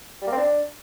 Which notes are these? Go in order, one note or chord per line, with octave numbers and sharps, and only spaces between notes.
G3
A#3
C4
D4